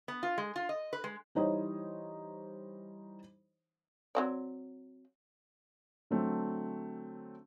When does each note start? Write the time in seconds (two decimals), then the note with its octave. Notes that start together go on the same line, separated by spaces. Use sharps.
0.08 B3
0.23 F4
0.38 G#3
0.56 F4
0.69 D#5
0.93 B4
1.04 G#3
1.35 E3 G3 D#4 C5 C#5 D#5
4.15 F#3 C4 D5
6.10 D3 F#3 A3 C4